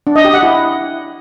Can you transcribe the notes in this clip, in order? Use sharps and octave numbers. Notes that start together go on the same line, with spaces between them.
D4
D#5
G4
F#5
E4